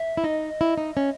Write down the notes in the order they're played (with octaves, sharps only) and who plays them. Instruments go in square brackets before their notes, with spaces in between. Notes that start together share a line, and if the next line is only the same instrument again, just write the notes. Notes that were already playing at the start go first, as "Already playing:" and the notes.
Already playing: [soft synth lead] E5
[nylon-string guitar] E4
[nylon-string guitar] D#4 [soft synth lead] D#5
[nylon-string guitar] E4
D#4
C#4